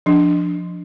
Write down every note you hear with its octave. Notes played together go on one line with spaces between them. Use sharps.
F3 D4